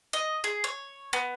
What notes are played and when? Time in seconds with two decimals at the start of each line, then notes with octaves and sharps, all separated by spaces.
0.13 D#5
0.44 G#4
0.64 C#5
1.13 B3